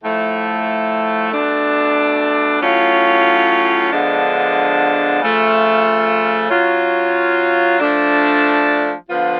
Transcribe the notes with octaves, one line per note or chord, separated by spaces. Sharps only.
A2 F3 A3
B2 A3 D4
A2 F#3 C#4 F4
D3 F3 G#3 B3 D4
C#3 F3 A3 F4
F#3 C#4 F4
F3 A3 D4
D3 F3 B3 F4